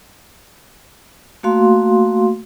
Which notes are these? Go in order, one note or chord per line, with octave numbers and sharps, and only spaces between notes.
A3 A#3 F#4 F5 C6